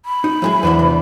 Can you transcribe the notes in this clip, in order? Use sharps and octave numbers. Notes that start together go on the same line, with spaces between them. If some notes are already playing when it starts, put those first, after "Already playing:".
B5
D#4
F#3 G#3 E4 G#4
E2 D4 B4 C5 F#5
C3